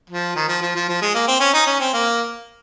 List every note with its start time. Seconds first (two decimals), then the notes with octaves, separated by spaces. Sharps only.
0.10 F3
0.36 D#3
0.48 F3
0.62 F3
0.76 F3
0.89 F3
1.02 G#3
1.15 A#3
1.28 C4
1.40 C#4
1.54 D#4
1.66 C#4
1.80 C4
1.93 A#3